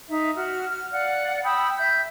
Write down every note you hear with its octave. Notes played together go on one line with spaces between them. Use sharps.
D#4 E5
F#4 F6
F6
D5 F5 F#5
G5 B5 D#6 E6
E5 G6